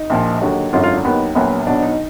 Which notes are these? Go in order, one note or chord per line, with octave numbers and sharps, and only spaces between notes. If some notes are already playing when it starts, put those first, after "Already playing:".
Already playing: D#4
A#1 A#2 F3
D#2 D3 F#3 F#4
G#1 F#2 D3 F#3 F4
F4
D4
D#2 D#3 F#3 B3
A#1 A#2 F#3 B3
B1 B2 F#3 D4
D#4